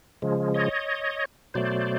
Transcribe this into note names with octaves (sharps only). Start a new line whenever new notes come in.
C#3 F3 G#3
C#5 D#5
B2 F#3 A3 C5 D5